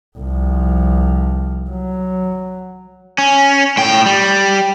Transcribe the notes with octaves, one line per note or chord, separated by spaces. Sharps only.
C2 F3
F#3
C#4
A2 G5
G3